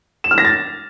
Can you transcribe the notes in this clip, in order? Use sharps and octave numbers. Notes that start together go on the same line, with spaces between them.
E7
F6
A#6
A6